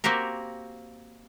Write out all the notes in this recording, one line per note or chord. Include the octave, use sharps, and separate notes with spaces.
A#3 C4 F#4 G4 A#4